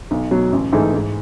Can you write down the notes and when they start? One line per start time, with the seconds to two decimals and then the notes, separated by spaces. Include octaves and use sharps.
0.11 B1
0.31 B2 F#3
0.52 A1
0.72 G#2 E3 A3 D#4
0.94 G#2